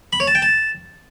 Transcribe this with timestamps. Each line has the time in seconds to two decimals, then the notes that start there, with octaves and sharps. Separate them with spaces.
0.13 B5
0.20 C#5
0.27 A5
0.35 G5
0.42 A5